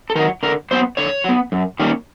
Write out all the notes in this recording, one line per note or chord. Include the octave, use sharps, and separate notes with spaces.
A4
D#3 F#3 A#4
D3 A#4
F#3 B3 C5
D3 C#5
F#3 B3
F#2
D#3 G3 A#3 C#4